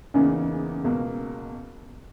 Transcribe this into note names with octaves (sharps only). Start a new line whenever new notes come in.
E2 C#3 E3 A#3 C#4 D#4
C#2 B2 A#3 B3